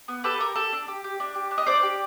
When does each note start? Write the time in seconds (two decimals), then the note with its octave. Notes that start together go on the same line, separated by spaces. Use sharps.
0.08 B3
0.24 G4 A4 B4
0.40 G4 A#4
0.56 G4 A4
0.72 D4
0.88 G4
1.04 G4
1.20 D4
1.35 G4
1.51 D4
1.58 D#5
1.66 D4 C5 D5
1.83 G4